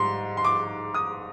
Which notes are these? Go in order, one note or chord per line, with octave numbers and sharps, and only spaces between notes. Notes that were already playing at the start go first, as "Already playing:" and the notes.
Already playing: G#2 G3 C6
C6
D6
D#6